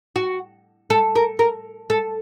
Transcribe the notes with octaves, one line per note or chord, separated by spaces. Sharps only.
F#4
A4
A#4
A#4
A4